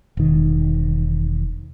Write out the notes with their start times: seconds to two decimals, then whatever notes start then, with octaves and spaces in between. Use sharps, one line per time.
0.17 E1 D#3